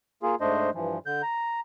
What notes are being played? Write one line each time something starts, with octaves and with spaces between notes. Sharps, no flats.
A#3 F4 G#4
G#2 A3 D4 C5 D#5
G2 E3 F3
D3 G6
A#5